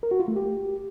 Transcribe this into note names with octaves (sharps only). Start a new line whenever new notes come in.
A#4
F#4
F4
A3
G4